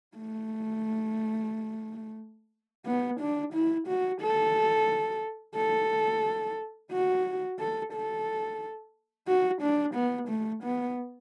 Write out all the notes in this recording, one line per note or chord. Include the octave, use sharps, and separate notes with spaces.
A3
B3
D4
E4
F#4
A4
A4
F#4
A4
A4
F#4
D4
B3
A3
B3